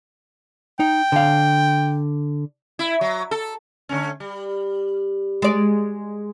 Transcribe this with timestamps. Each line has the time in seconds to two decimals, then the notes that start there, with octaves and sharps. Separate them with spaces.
0.80 D#4 G5
1.12 D3 F5
2.79 E4
3.01 F#3
3.31 A4
3.89 D3 A3 C#4
4.20 G3
5.42 G#3 D5